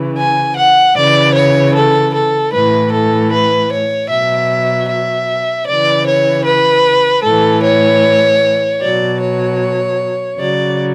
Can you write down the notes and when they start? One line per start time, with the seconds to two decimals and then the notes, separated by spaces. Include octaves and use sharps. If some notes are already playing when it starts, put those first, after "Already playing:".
Already playing: C#3 E3
0.18 G#5
0.57 F#5
0.96 C#3 E3 D5
1.35 C#5
1.74 A4
2.15 A4
2.53 A2 E3 B4
2.93 A4
3.32 B4
3.72 C#5
4.10 B2 F#3 E5
4.89 E5
5.68 C#3 E3 D5
6.07 C#5
6.45 B4
7.24 A2 E3 A4
7.64 C#5
8.81 B2 F#3 D5
9.20 C#5
10.39 C#3 F#3 D5